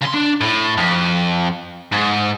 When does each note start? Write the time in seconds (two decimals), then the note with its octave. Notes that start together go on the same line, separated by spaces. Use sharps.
0.02 C#3 C6
0.14 D4
0.41 A2
0.78 F2
1.92 G#2